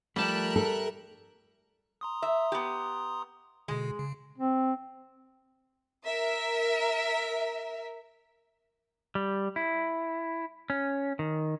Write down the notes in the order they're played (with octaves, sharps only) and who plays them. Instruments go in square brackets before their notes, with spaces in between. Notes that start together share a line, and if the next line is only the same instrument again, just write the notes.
[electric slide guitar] F3 A3 [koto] G3 A5 [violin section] A#4 E5 F#6
[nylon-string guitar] A4
[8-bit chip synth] A#5 C6 D#6
[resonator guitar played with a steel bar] E5
B3 G4
[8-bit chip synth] B2 D3 [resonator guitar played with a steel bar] G#3
[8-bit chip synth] C#3
[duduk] C4
[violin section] A#4 E5
[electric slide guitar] G3
E4
C#4
D#3